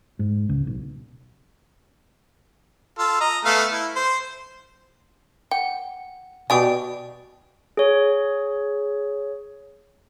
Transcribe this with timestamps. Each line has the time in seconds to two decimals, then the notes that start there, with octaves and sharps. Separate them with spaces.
0.19 G#2
0.49 C#2
0.67 B1
2.99 F4 A4
3.21 D#5 A#5
3.45 A3 B3 F5
3.72 E4
3.96 C5
5.51 F#5 G5
6.50 B2 B3 G4 D5 G5 G#5 C#6
7.77 G#4 C#5